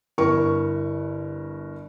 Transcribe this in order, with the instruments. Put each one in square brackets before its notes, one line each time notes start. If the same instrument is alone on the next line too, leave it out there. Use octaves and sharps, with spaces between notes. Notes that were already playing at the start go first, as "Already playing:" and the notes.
[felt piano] G1 E4 A#4 C#6